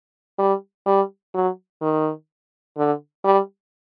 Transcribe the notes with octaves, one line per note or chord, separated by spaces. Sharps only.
G3
G3
F#3
D#3
D3
G3